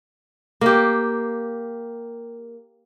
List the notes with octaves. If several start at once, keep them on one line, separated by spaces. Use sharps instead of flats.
A#3 G4